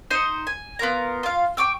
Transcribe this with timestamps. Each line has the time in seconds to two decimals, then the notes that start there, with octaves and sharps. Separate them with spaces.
0.11 D#4 C5 C6
0.47 G#5
0.79 B3 F4 A#4 A#5
1.23 F4 F5
1.57 G5 C#6 D6 E6